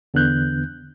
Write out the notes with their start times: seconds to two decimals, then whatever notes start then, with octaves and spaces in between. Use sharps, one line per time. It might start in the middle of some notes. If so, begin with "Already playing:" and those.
0.14 E2 D3 B3 F#6 G6